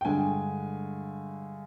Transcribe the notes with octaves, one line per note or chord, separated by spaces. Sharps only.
G5
G2 D3 G#3 D4 G#5